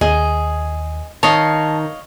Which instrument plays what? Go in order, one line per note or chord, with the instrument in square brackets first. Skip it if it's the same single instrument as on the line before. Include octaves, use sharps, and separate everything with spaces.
[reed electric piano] D#2 [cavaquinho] G#4 [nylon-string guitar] D#5
[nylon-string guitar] D#3 [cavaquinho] C#5 D#5 F5 [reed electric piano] A5